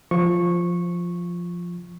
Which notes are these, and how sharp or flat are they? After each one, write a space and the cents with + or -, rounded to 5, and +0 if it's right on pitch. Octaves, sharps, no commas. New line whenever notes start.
F3 +0 C#6 -10